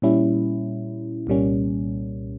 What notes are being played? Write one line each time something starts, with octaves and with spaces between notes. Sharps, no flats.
A#2 G3 C#4 E4
C2 A#2 G3 A#3 C#4